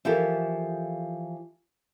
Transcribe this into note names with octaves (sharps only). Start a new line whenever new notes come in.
E3 F3 G4 A4 A#4 E5